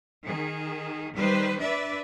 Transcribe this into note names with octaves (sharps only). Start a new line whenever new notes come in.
D#3 G#4
D#3 G3 B4 C5
D4 B4 D5 E5